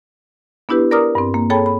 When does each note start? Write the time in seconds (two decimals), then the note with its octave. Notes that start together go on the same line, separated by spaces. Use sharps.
0.69 B3 D4 E4 G4 B4
0.91 A#4 D5 A#5 D6 D#6 F6
1.15 G2 C4
1.34 A#3
1.50 G#4 A4 C#5 G5 A5 B5
1.66 B5